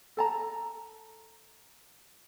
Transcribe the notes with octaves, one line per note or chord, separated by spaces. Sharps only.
A4 A5 A#5